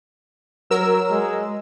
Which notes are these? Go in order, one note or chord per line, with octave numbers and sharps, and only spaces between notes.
F#3 A#4 E6
G#3